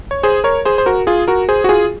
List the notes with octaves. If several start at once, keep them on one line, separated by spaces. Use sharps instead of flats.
C#5
G#4 C5
A#4 C#5
G#4 C5
C5
F#4 A#4
F4 G#4
F#4 A#4
G#4 C5
F#4
F4 G#4